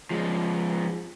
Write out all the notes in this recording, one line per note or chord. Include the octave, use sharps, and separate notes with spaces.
F3 G#3